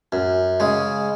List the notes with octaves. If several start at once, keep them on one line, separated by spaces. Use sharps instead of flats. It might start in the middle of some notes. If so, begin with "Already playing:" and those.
F#2
C#3 G#3